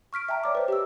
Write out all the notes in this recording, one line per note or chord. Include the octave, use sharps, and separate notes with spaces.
C#6 F6 B6 D7
E5 G5 A5 A#5
C#5 D5 D6
B4 C5
G4 D#5 E6